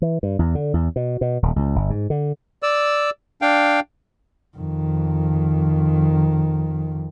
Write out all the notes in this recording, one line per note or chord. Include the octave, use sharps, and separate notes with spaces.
E3
G2
E2
D3
E2
B2
B2
D#1
C#2
G1
G#2
D3
D5 E6
D4 F5 G5
F2 D#3